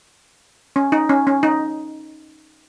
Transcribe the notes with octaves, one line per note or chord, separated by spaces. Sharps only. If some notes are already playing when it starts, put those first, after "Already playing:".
C#4
D#4
C#4
C#4
D#4